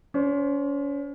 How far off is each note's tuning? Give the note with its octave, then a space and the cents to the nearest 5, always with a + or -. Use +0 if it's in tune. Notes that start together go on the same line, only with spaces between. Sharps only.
C#4 +35 C5 +5